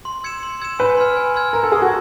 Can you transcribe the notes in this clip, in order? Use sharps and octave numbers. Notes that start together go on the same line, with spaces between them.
C6
E6 G#6 C#7 E7
C6
E6 G#6 C#7 E7
B4 G#5
C6 F6 G#6
G#5
C6 F6 G#6
A#4 A#5
A4
G#4 C#6 E6
F#4